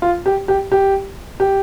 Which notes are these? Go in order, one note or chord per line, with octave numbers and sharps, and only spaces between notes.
F4
G4
G4
G4
G4